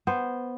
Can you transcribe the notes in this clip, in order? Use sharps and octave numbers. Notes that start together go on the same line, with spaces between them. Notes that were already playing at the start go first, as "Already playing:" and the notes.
B3 C5